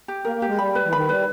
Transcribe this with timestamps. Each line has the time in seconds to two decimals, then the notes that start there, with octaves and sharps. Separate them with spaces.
0.08 G4
0.25 A#3 A#4
0.36 A#3
0.42 G4
0.48 G#3
0.58 G3 B5
0.75 B4
0.85 E3
0.93 D#3 B5
1.09 G3 B4